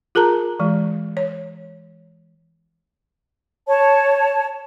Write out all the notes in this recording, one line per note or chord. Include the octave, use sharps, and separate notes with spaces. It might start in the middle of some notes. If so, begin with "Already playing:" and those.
F4 G#4 A#4 A5 A#5
E3 G#3
C#5
C#5 A5